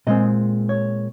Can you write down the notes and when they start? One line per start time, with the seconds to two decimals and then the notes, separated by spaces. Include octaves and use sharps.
0.07 A#2 G#3 C4 D#5
0.69 C#5